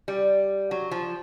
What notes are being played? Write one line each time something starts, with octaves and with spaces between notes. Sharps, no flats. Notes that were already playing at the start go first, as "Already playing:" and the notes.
G3
F#3
F3